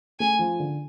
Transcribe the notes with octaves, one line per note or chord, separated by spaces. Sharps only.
A3 G#5
F3
D3